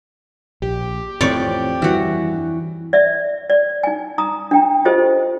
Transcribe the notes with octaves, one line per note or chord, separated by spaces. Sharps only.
A#1 G4
F2 A2 E3 F3 C#5 D5
G2 E3 F#4
D5 E5
D5
D#4 G#5
D#4 A#5 D#6
D4 G5 A#5
F4 G4 A4 C5 D#5